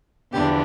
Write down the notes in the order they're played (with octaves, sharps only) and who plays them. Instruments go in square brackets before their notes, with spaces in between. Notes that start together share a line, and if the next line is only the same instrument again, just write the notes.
[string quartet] E2 D3 F3 B3 D4 G4